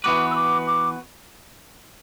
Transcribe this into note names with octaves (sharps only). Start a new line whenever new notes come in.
E3 B3 F#4 B4 D6
E6
D6
D6